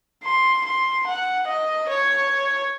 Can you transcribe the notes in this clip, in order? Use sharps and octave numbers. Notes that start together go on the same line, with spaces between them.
C6
C6
F#5
D#5
C#5